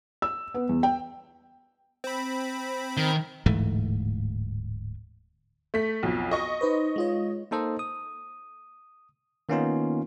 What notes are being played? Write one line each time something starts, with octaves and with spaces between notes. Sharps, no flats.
E6
B3
E2
G5
C4 B5
D#3
D1 G#2 E3 A3
A3 B6
B1 F2
D#5 C#6
D#4 B4 C5
G#3 F4 C#5
A#3 D#4 A4 C5 D#5
D#6
D#3 A#3 B3 C#4 D#4 F4